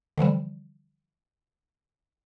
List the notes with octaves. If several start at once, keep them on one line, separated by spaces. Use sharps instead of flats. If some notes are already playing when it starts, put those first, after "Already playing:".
D3 E3 F3 G3